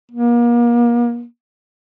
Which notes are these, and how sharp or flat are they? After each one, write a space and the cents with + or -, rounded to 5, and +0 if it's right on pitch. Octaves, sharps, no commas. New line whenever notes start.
A#3 +35